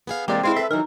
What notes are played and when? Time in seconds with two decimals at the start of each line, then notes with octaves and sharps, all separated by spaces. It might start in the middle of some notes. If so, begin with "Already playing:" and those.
0.07 B3 G#4 F5
0.28 C3 E3 G#3 A#3 G4 D5
0.43 G#3 C4 E4 B4 F5 C6
0.56 A4 B4 E5
0.71 D#3 E3 F#3 D#4 A#4